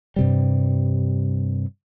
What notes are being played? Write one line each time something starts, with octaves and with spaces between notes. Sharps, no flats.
G2 C3 G3